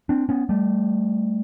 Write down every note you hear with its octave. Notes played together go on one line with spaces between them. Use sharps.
C4 D4
B3 C#4
G3 A3